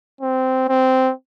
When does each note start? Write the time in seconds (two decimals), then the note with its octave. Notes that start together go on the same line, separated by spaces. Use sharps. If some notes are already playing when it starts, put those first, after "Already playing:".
0.21 C4
0.69 C4